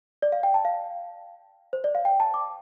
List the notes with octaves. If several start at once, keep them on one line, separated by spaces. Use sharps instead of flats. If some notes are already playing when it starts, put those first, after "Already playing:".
D5
F5
G5
A5
F5
C5
D5
F5
G5
A5
D6